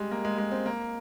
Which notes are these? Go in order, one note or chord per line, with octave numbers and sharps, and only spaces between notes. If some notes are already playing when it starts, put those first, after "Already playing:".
Already playing: G3 G#3
A#3
G#3
G#3
C4
A#3